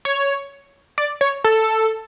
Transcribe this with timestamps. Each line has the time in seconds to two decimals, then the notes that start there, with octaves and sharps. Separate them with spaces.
0.05 C#5
0.98 D5
1.21 C#5
1.44 A4